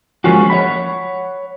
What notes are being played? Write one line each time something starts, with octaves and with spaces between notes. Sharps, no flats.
F3 G#3 A#3 C#4 F4 F#4
C#5 E5 F#5 B5